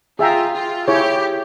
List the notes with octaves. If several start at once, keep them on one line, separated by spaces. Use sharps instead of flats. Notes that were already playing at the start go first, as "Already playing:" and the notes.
F4 G#4 E5 G5 A#5
F4
E4 G4 G#4 C#5